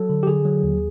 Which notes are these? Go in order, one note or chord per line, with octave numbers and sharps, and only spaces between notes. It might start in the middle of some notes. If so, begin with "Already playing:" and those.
Already playing: F#3 A4
D3
G4
D3 G#4
F#3
D#2